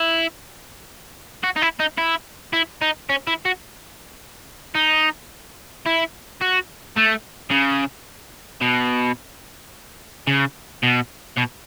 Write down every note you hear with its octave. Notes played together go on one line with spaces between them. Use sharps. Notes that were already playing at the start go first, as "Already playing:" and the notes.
Already playing: E4
F#4
D#4
E4
D#4
E4
E4
D#4
C#4
E4
F#4
D#4
E4
F#4
A3
C#3
B2
C#3
B2
B2